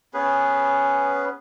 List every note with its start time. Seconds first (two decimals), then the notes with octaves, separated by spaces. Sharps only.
0.14 B3 C#4 G#4 B4